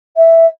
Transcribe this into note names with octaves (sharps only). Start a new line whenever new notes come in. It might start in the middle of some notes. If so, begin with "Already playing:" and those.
E5